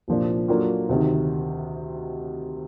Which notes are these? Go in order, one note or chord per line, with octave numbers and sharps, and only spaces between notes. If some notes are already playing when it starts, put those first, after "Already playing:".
C2 A#2 F3 A#3 D4
F#3 A#3 D4 F4 A4
D2 C3 D#3